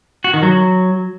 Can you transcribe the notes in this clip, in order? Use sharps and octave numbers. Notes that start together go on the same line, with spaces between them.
F#4
D#3
F#3